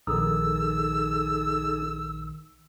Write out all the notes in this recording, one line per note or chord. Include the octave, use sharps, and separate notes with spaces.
A#1 D#3 D#4 G#4 A4 E6